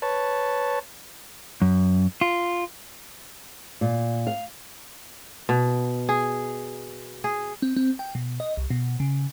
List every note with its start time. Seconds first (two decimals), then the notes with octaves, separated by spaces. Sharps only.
0.02 B4 C#5 A5
1.62 F#2
2.21 F4
3.81 A#2
4.27 F5
5.49 B2
6.09 G#4
7.24 G#4
7.62 C4
7.77 C4
7.99 G5
8.15 B2
8.40 D#5
8.57 C2
8.70 B2
9.00 C#3